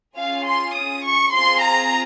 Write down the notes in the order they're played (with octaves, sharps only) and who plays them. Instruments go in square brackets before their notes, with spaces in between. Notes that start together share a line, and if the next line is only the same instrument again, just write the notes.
[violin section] C#4 F4 G#4 F5
C6
D#6
C#6
C4 F4 G#4 C6
A#5